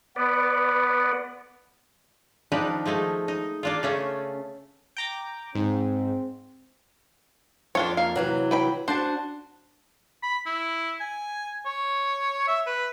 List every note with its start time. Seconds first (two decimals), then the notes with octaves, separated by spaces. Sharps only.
0.16 B3 B4 D5
2.52 D#3 F3 D4 D#4 B4
2.85 F3 G#3 A3 D#4
3.28 D#4
3.63 A#3 D4 F4
3.83 C#3 A3 C#4
4.97 G5 A#5 D6
5.55 G#2 C4
7.75 F2 D4 F4 C#5
7.97 A#3 F5
8.16 C3 E3 F#3
8.51 B4 G5 B5
8.88 D4 F#4 C5 A5
10.22 B5
10.46 E4
11.00 G#5
11.66 C#5
12.48 E5
12.67 B4